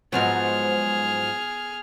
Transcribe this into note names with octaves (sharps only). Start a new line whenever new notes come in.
G#2 F3 F#3 B3 G#4 F6